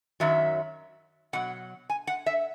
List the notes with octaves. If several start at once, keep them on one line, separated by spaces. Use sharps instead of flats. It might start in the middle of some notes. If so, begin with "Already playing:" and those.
F#2 D#3 F#3 E5
B2 F#3 F#5
G#5
F#5
E5